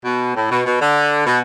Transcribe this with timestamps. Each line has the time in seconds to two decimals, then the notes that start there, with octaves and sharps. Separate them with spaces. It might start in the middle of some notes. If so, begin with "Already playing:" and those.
0.05 B2
0.35 A2
0.51 B2
0.65 B2
0.81 D3
1.26 B2